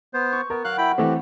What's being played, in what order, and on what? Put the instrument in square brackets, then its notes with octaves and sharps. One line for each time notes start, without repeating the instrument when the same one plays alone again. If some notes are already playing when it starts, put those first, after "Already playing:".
[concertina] B3 C5
[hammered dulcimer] C#6
[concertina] B3 [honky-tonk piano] A#4
[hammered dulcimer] F#3 [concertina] F5 F#6
[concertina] E4 G5 B5
[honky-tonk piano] E3 A3 C4 [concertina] F#4 G4